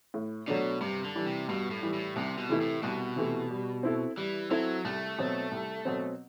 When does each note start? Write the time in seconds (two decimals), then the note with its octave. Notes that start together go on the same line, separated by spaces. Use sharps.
0.14 A2
0.47 B2 F#3 A3 D4
0.81 G2 C3
1.04 D3
1.15 E3 G3
1.26 C3
1.49 G2 B2
1.71 A2
1.83 E3 G3
1.93 A2
2.16 C2 C3
2.38 B2
2.49 C3 E3 A3 E4
2.61 A2
2.83 C2 B2
3.16 C3 E3 A3 E4
3.51 G3
3.83 C4 E4 A4
4.17 E3 G3
4.51 F#3 C4 E4 A4
4.84 C2 A3
5.18 B2 F#3 C4
5.51 C2
5.85 B2 F#3 C4